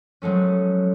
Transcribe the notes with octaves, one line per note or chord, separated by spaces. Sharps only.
F3 F#3 G#3 A3 C#4